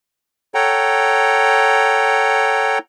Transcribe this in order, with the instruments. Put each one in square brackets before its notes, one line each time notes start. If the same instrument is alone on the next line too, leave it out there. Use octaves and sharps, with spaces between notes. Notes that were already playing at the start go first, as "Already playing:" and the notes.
[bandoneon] A4 C#5 F#5 G5 A#5